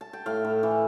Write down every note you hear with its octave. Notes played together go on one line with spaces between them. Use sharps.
A5
G5
A2 F5
A2
E3